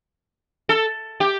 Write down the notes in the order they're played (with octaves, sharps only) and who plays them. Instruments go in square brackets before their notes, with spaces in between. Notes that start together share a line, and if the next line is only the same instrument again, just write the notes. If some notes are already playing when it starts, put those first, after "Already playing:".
[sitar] A4
G4